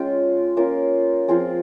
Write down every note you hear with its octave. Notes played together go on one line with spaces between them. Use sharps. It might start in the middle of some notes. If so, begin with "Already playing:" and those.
Already playing: G#3 C#4 F4 G5
A#3 C#4 F4 A#4
F3 C4 F4 G#4